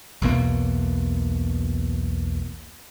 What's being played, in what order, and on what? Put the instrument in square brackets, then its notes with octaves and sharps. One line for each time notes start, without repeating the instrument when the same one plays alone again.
[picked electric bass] B1 E2 B2 A#3